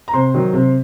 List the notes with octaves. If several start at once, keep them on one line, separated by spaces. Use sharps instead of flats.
A#5
C3 C5 C6
D#3 F#3
C3